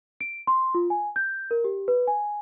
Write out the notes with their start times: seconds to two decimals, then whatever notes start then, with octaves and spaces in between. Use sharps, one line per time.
0.21 D7
0.47 C6
0.75 F4
0.90 G#5
1.16 G6
1.51 A#4
1.64 G4
1.88 B4
2.07 G#5